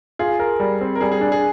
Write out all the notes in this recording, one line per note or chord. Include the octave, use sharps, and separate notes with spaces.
F4 G#4
A#4
G3
C4
A#4
G3 G#4
G#4
D4
G#4